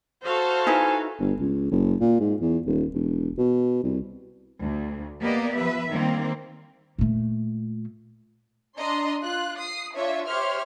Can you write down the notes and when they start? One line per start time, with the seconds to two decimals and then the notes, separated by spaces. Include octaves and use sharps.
0.23 F#4 A4 C5 F5 A5
0.67 D#4 E4 B4 G#5
1.20 G1
1.40 C#2
1.71 F#1
2.01 A#2
2.20 G#2
2.41 E2
2.67 D#1
2.94 E1
3.37 B2
3.83 C2
4.61 D2
5.20 A#3 B3 G4 D5 D#5
5.56 F3 B4 E5
5.89 D#3 G3 A#3 C4
6.98 A#2 A3
8.78 D4 D#5 A#5 C6
9.23 F4 F#6
9.58 D#6 C7
9.93 D4 F4 C#5 E5
10.26 G4 C5 C#5 E5 C6 F6